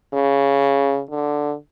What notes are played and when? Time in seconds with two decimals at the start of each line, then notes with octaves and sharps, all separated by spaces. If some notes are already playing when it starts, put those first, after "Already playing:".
0.14 C#3
1.10 D3